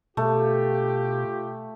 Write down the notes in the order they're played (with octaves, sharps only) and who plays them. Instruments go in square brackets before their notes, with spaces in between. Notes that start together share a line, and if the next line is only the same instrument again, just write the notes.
[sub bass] B2 [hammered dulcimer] A3 [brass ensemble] F4 G4